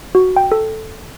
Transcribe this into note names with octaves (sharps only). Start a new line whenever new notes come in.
F#4
G5
A4